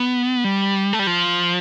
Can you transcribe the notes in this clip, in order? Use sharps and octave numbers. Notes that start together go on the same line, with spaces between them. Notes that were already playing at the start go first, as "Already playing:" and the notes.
Already playing: B3
G3
A3
G3
F3